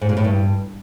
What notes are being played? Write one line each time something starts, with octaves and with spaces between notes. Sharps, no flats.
G#2
A#2
A2
G2